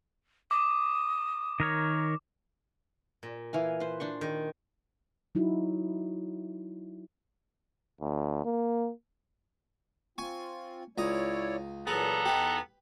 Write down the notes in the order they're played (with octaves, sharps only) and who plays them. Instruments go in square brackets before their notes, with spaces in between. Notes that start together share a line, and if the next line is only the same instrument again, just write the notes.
[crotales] D6 [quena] D#6
[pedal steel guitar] D#3 A#4 C#5
[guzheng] A#2
[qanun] E3 F5 G#5
B4 C5
D4 C5 C#6
[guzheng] D#3
[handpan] F#3 D#4 E4 F#4
[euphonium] D2
A#3
[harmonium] C4 F4 [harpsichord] G#5 C#6
[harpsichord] C#2 A#5 D#6 [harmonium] E4 C#5 D5
[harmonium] A#2 E3 F#3 [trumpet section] B3 A4 A#5 [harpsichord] G#4
[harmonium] E2 D#4 [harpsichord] G4 B4